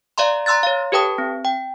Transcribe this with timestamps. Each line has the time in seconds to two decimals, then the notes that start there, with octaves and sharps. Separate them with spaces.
0.18 D5 E5 F5 A#5 C6
0.46 A#5 C6 E6 F#6 A6
0.63 C#5 F5
0.92 G4 A4 B4 G5 A5 D#6
1.18 C4
1.45 G5